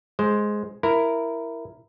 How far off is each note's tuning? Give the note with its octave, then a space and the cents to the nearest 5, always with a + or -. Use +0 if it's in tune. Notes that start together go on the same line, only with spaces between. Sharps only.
G#3 +10 C5 +0
E4 +5 A#4 +0